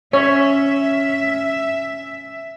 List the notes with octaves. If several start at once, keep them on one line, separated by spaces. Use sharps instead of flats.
C#4 C#5 E5